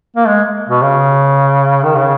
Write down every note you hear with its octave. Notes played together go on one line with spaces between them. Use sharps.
A#3
G#3
B2
C#3
D#3
C#3